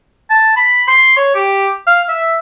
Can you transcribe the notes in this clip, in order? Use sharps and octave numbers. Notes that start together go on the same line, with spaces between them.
A5
B5
C6
C#5
G4
F5
E5